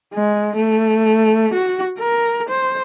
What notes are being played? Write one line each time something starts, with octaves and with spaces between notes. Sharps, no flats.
G#3
A3
F#4
A#4
C5